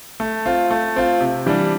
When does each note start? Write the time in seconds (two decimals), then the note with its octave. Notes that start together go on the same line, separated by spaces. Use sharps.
0.20 A3
0.46 C4 F4
0.71 A3
0.96 C4 F4
1.20 C3
1.46 E3 G3 D4